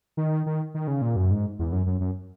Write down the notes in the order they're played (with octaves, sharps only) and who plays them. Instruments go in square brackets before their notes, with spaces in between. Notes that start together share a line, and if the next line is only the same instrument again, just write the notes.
[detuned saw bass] D#3
D#3
D#3
C#3
A#2
F#2
G#2
E2
F#2
F#2
F#2